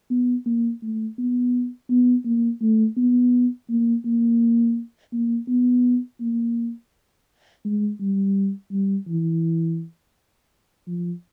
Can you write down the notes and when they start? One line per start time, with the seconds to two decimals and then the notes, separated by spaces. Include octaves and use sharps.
0.11 B3
0.46 A#3
0.82 A3
1.18 B3
1.90 B3
2.25 A#3
2.62 A3
2.97 B3
3.70 A#3
4.05 A#3
5.13 A#3
5.48 B3
6.21 A#3
7.65 G#3
8.00 G3
8.72 G3
9.08 E3
10.87 F3